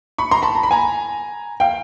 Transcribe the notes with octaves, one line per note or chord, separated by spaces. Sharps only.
B5 C#6
A#5 C6
A5 B5
A#5
B5
G#5 A#5
F5 G5